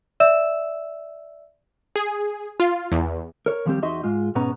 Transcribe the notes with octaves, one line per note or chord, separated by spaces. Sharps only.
D5 E5 E6 E7
G#4
F4
E2
A#4 C#5
D#2 F3 G3 G#3 C4 G4
E2 D#4 F#4 D#5 E5 C6
G#2 G#3 F4
G#2 B2 B3 C#4 A#5